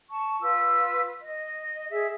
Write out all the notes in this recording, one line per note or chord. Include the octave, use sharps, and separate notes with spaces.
A5 C#6
F4 B4 E6
D#5
G#4 E5